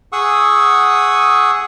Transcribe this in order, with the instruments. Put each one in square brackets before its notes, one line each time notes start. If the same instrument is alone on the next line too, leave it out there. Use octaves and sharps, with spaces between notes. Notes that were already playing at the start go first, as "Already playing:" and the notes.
[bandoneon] G#4 F#5 C#6 D#6 E6